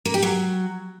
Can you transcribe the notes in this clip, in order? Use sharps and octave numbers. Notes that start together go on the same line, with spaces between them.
A#3
G4
F#3